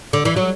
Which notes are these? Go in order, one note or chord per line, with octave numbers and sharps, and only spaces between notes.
D3
E3
F#3